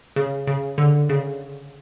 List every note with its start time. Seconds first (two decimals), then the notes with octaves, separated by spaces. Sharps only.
0.16 C#3
0.47 C#3
0.78 D3
1.09 C#3